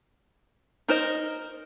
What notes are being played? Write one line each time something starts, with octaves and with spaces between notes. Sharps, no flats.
D#4 A#4 C5 D#5